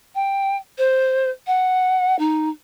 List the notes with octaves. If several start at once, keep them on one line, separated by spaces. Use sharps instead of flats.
G5
C5
F#5
D#4